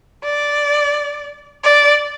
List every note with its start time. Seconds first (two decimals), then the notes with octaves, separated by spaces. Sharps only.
0.24 D5
1.64 D5